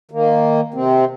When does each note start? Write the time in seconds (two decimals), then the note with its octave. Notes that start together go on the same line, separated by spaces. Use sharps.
0.11 D#3 A#3
0.74 C3 C4